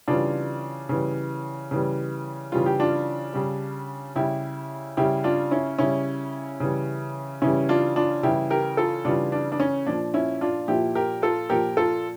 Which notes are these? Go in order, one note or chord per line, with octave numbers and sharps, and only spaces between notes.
C#3 E3 G3 D4 F4
C#3 E3 G3
C#3 E3 G3
C#3 E3 G3 F4
G4
D4 F4
C#3 G3
C#3 G3 E4 G4
C#3 G3 E4 G4
D4 F4
C#4 E4
C#3 G3 C#4 E4
C#3 E3 G3
C#3 E3 G3 C#4 E4
D4 F4
D4 F4
C#3 E3 G3 E4 G4
G4 A#4
F4 A4
C#3 E3 G3 D4 F4
D4
D4
C#4
A#2 F3 D4
C#4 E4
D4 F4
A#2 F3 E4 G4
G4 A#4
F4 A4
A#2 F3 G4 A#4
F4 A4